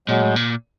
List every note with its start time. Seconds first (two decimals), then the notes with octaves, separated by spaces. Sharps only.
0.08 A#2 F#3 G#3
0.22 A2
0.36 A#2